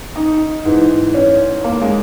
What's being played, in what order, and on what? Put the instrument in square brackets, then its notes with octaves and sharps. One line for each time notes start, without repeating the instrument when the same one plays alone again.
[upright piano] D#4
G#2 E3
C#4
A#3
G#3